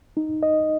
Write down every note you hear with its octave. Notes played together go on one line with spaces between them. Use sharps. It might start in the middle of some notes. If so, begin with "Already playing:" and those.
D#4
D#5